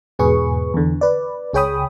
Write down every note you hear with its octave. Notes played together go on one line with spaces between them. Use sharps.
E2 G#2 B2 G#4 B4 C#6
E2 D3
B4 D5
C#2 G#4 C#5 G5 B5 D#6